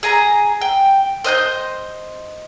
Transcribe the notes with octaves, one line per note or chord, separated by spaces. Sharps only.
G#4 G#5 A#5
G5
C5 D#5 F#6 G6